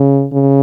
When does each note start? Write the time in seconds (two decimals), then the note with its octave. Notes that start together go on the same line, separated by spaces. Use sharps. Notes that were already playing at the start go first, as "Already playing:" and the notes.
Already playing: C#3
0.33 C#3